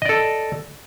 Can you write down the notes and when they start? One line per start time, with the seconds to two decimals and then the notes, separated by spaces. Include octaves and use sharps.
0.02 D#5
0.06 D5
0.09 A4